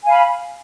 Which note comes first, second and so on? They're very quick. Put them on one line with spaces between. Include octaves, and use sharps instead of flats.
G#5 F5 B5